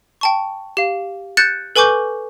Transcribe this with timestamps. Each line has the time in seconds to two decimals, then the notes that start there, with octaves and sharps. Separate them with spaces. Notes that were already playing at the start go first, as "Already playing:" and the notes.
0.21 G5 A5 C#6
0.77 G4 F5
1.37 F#6 G6 A6 C#7 E7
1.76 A4 B4 G#5 C#6 D6 G6